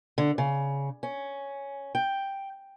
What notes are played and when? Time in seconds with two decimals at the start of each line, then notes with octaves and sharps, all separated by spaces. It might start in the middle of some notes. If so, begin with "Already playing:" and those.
0.18 D3
0.38 C#3
1.03 C#4
1.95 G5